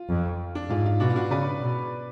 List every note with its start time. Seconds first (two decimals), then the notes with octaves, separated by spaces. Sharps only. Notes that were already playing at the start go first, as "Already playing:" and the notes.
Already playing: F4
0.09 F2
0.55 D4
0.69 G#2 F4
0.86 F4
1.00 B2 D4 F#4
1.10 F4
1.16 D4 F#4
1.30 C#3 B4 D5
1.61 B2